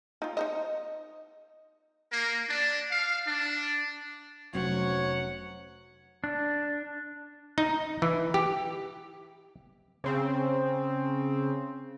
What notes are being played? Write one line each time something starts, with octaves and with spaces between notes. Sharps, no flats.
D#4 F4
D#4 C5 D#5
A#3
D4
F5
D4
F1 F#3 C#4 C5 C#5 F#5
D4
D#4
E3
G4
C#3 C4